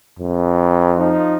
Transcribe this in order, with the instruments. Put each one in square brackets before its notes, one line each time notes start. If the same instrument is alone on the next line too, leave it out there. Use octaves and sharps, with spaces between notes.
[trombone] F2
[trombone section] F3 D#4